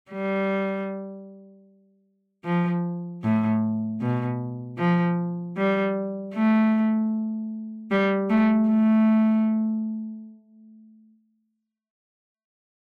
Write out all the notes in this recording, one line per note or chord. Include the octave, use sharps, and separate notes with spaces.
G3
F3
A2
B2
F3
G3
A3
G3
A3
A3